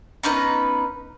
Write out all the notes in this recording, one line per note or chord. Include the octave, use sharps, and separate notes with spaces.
B3 C#4 D#4 B4